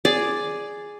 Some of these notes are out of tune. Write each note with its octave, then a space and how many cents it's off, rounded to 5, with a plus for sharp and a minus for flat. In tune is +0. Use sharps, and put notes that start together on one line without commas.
G#4 +0 D5 +0